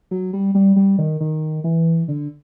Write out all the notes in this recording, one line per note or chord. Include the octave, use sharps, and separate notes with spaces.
F#3
G3
G3
G3
D#3
D#3
E3
D3